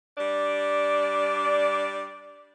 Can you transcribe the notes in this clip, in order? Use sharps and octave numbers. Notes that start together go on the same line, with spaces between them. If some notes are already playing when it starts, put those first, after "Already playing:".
G3 D4 D5